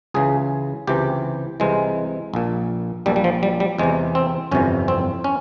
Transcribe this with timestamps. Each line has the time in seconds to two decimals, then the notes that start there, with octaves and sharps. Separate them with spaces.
0.14 C#2 C#3 E3 G#4
0.87 C#2 C3 E3 G4
1.60 C2 C3 E3 G#3
2.34 A#1 A#2
3.06 A#1 A#2 G3
3.16 G3
3.24 F3
3.43 G3
3.60 G3
3.78 E2 C3 E3 G#3
4.15 C4
4.51 G1 F2 C3 E3 C#4
4.88 C4
5.24 C#4